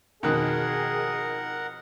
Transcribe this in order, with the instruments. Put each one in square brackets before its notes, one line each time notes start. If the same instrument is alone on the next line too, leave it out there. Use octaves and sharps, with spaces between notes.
[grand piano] F2 B2 [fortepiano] D#3 F#6 [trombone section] G#4 [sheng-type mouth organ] A#4 F#5